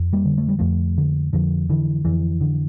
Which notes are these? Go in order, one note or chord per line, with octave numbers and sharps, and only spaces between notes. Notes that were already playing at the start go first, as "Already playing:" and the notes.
Already playing: F2
G3 A#3
D3
A3
G3
F2 F3 A3
D3
F2 D3 F3
D3 E3
F2 E3
D3